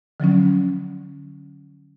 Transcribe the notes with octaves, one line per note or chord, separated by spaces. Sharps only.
D3 F3 F#3 C#4